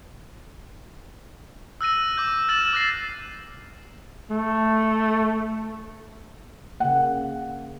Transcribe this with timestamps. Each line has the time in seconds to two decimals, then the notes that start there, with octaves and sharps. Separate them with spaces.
1.81 E6 F#6 A#6 D#7
2.17 D6 G6
2.48 F6 A6 E7 F#7
2.73 D6 F#6 A#6 C7
4.30 A3
6.80 C#3 A#3 F#5